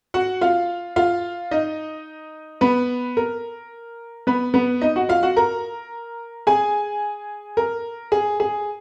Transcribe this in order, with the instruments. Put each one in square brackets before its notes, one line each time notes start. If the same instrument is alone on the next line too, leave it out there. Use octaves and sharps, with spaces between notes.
[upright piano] F#4 F#5
F4 F5
F4 F5
D#4 D#5
B3 B4
A#4
B3 B4
B3 B4
D#4 D#5
F#4 F#5
F4 F5
F#4 F#5
A#4 A#5
G#4 G#5
A#4
G#4
G#4